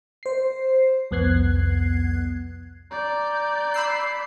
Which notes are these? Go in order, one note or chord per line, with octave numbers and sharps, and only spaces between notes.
C5 C7
C2 F2 B3 F#6 G#6 C7
D5 A#5 G6
B5 E6 C7